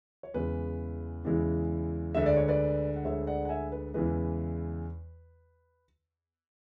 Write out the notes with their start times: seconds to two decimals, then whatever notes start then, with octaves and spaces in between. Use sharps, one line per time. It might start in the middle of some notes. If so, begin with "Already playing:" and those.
0.23 C#5
0.34 E2 C#3 E3 G#3 B4
1.25 E2 C#3 E3 G#3
2.15 D2 D3 G#3 E5
2.26 D5
2.37 C#5
2.48 B4 D5
2.96 F#5
3.05 D2 D3 G#3 C#5 E5
3.27 D5 F#5
3.45 F#5
3.49 E5 G#5
3.72 B4
3.94 E2 C#3 E3 G#3 B4